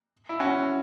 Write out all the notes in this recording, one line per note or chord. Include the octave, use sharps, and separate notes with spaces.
E4
C#4 F#4